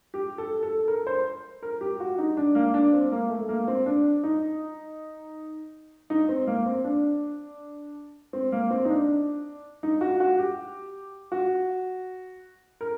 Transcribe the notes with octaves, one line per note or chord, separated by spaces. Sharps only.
G4
A4
A4
A#4
C5
A#4
G4
F#4
D#4
D4
A#3
D4
C4
A#3
A3
A#3
C4
D4
D#4
D#4
C4
A#3
C4
D4
C4
A#3
C4
D#4
D4
D#4
F#4
F#4
G4
F#4
A#4